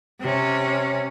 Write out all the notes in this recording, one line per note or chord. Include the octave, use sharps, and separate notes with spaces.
C3 C#4